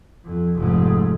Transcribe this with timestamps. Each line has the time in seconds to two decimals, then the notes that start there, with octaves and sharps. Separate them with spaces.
0.25 F2
0.55 F1 G#2